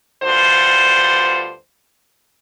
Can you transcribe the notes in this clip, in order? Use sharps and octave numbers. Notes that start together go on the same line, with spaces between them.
D2 G2 D3 F4 C5